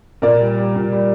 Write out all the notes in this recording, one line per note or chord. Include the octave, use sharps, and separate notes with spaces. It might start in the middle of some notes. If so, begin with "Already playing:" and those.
A#2 A#4 D5
G3
G3
A#2
G3